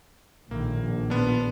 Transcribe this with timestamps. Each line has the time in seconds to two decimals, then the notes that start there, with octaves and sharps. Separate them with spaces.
0.51 A#1 A2 D#3 A#3
1.10 B3 D4 C6 F6